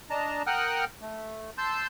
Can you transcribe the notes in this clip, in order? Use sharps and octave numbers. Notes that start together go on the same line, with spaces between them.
D4 D#5 A5 A#5
A#4 F#5 G5 D#6 F6 F#6
A3
A5 C6 E6 G6